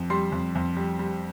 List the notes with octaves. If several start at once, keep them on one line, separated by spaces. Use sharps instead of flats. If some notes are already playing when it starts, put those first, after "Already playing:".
Already playing: F2
G3 C6
F2
F2
G3
G3